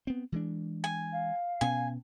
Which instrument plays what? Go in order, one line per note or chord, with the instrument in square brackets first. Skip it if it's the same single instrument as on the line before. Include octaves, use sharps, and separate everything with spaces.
[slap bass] B3 C4
E3 G#3 D4
[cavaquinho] G#5
[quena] F5
[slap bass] B2 B3 C#4 [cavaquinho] G#5